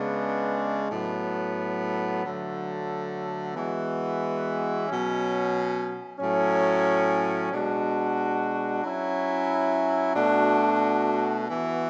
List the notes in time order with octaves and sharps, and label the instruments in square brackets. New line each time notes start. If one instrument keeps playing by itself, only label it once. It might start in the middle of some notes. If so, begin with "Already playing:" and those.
Already playing: [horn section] C#3 G#3 B3 D4
A2 F#3 B3
D3 F#3 A3
E3 G#3 B3 F#4
B2 F#3 C#4
A2 F#3 C#4
B2 G#3 D4 F#4
F#3 C#4 E4
B2 A3 D4 F#4
E3 B3 F#4